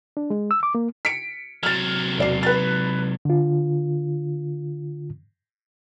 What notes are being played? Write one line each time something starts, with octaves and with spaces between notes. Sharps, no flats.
D4
G#3
E6
D6
A#3
B6 C#7 D7
C3 F#3 F6 A6
E1 D5 C7
B4 A6
D3 F4